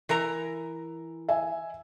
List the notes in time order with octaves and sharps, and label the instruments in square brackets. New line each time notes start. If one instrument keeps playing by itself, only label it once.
[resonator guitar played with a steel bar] E3 A#4 A#5
[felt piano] E5 G#5